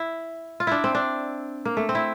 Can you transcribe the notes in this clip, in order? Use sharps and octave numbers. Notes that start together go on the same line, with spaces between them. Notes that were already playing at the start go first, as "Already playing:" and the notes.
Already playing: E4
F4
D4 E4
C4
D4
A#3
A3
C4
E4